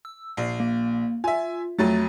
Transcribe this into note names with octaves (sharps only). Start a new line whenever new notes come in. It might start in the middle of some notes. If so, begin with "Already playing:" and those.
E6
A#1 C7
A#3
F4 E5 G#5
F2 F#3 A3 A6